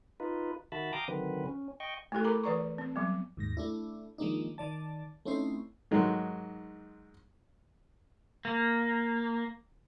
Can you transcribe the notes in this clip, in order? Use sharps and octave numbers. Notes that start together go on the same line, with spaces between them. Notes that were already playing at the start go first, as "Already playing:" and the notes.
D#4 F4 B4
D#3 F#4 E5 A5 B5
F5 G5 A#5 D6 D#6
D3 D#3 F#3 C4 B4
C#4
D#5 G5 C#6
A3 E4 G4 A4
A#4 A#5 B5 D6
E3 B4 D5 A#5 C#6
C4
F#3 G3 B3
D#2 G#2 A#6
A3 D4 E4
D#3 F3 G#3 A#3 D4 D#4
D#3 D5 A5
A3 C4 C#4 D#4 E4 C5
G#2 D#3 F#3 G#3
A#3